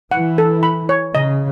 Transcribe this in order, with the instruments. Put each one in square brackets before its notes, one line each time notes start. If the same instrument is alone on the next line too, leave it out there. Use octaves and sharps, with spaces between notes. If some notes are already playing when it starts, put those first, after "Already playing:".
[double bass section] E3 [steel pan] F#5
[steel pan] A4
B5
C#5
[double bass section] C#3 [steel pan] D#5